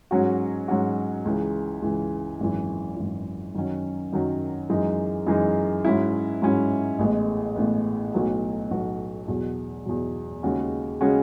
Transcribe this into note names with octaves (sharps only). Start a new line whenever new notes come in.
G#2 F#3 C#4 F#4
G#2 F#3 C#4 F#4
C#2 C#3 E3
C#2 C#3 E3
G#1 F#2 E3
G#1 F#2 E3
F#2 D#3 F#3 C#4
F#2 D#3 F#3 C#4
F#2 E3 G#3 D#4
F#2 E3 G#3 D#4
G#2 F#3 C#4 E4
G#2 F#3 C#4 E4
A1 A2 G#3 B3
A1 A2 G#3 B3
B1 A2 F#3 B3 F#4
B1 A2 F#3 B3 F#4
E2 B2 F#3
E2 B2 F#3
D#2 C#3 G#3 C#4 F#4
C#3 G#3 C#4 F#4